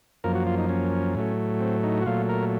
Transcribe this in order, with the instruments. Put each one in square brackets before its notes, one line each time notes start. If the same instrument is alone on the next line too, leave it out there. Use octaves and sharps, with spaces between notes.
[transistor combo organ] F#2 F3 A#3 A#4
F#4
F4
D#4
C#4
A2 F#3 A3
C4
D#4
F#4
A#2 F#3 A3 F4
A#4